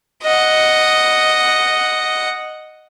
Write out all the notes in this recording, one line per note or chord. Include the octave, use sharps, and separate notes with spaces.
D#5 F#5